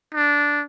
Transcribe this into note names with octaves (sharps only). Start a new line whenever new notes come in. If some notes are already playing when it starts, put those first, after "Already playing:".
D4